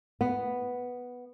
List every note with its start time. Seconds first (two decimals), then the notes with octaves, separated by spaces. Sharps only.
0.21 B3